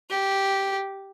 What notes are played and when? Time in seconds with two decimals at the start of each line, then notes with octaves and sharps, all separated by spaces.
0.10 G4